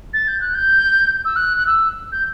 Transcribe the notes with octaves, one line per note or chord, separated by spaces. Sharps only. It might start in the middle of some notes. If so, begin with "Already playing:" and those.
A6
G6
F#6
G6
E6
F#6
F#6
E6
G6